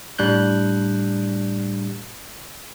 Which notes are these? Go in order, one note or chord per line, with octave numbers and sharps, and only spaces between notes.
A2 G3 D4 F#6 G6